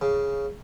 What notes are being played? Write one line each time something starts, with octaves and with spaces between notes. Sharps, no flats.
C#3